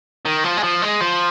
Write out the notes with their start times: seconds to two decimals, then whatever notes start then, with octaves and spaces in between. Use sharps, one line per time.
0.25 D#3
0.44 F3
0.57 G#3
0.63 F3
0.82 G#3
1.01 F3